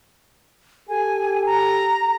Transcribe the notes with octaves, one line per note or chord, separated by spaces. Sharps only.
G4 A4 G#5
A#5